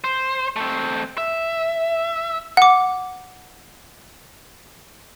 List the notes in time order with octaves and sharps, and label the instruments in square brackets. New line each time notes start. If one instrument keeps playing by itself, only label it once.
[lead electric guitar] C5
A3 C4
E5
[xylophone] F#5 D6